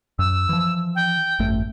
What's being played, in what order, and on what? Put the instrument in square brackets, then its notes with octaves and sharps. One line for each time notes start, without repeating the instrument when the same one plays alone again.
[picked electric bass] F#2 [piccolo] E6
[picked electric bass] E3 F3
[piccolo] G5
[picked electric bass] G#1 F#2 A3